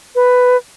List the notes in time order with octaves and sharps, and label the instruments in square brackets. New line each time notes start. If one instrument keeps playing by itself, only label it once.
[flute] B4